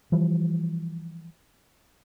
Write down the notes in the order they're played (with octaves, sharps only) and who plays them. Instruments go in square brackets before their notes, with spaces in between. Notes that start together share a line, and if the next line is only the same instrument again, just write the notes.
[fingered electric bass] E3 F3 G3